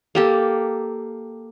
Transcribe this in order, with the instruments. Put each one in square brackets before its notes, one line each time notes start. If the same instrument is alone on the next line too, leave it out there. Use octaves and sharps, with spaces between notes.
[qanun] A#3 G4 A4